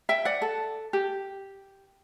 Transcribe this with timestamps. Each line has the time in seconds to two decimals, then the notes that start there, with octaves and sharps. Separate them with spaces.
0.09 E5 G5
0.25 D5 F#5
0.42 A4
0.93 G4